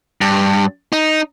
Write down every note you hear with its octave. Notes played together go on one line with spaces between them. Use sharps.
G2
D#4